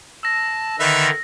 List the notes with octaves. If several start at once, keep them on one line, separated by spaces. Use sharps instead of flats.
A5 E6 A#6
D3 D#3 D#4 B4 E5